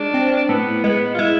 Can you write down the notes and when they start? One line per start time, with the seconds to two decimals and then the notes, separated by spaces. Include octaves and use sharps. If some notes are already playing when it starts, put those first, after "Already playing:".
Already playing: G#3 D4
0.14 C4
0.49 A2 B3
0.84 G#3 B3
1.14 F4
1.19 G#3 E4